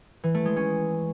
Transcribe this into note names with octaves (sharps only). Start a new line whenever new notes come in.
E3
A3
G#3
C#4